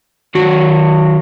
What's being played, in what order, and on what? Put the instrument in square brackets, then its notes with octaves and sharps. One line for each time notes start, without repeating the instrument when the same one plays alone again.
[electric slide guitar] D#3 F#3 F#4